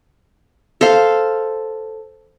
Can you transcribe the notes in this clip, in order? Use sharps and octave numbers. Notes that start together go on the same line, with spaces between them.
A4 C5 F5